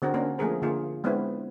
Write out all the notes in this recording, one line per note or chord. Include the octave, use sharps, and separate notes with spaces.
D3 C4 F#4 A#4
A#3 C#4 D4 A#4
F3 A3 A#3 G#4 A#4 C5
D3 A#3 F4 G#4
G#3 B3 C4 D4 E4